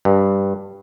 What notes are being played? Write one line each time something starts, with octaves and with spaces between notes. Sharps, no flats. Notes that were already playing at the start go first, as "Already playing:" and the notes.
G2